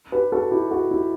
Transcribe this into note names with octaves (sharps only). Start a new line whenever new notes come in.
G4 B4
F#4 A4
E4 G4
F#4 A4
E4 G4